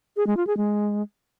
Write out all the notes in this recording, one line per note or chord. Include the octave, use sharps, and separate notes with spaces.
G#4
G#3
F4
G#4
G#3